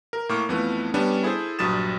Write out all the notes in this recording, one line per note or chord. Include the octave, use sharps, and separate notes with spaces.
A#4
A2 A#3 C#6 D6 F6
F2 E3 F3 A3 B3
G3 B3 C#4 D4
E4 G#4 A4 C5
A#1 G2 F#3 D#6 A6 E7